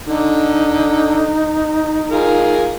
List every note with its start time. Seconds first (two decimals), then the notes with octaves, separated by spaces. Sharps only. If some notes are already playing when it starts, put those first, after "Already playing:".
0.07 D3 D#4
2.10 F4 G#4 A#4